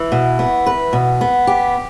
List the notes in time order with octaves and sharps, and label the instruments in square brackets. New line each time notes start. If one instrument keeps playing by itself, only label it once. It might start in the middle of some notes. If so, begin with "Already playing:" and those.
Already playing: [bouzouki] E3
[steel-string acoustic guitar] B2
B3
B4
B2
B3
G4